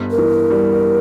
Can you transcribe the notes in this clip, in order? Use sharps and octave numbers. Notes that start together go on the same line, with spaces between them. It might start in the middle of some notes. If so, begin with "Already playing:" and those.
Already playing: G1
A#4
E3
G3